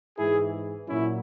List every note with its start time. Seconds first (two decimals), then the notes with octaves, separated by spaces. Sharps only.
0.18 G#2 E3 E4 G#4
0.88 A#2 F#3 C#4 E4